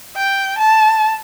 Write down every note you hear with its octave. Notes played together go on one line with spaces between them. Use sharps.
G5
A5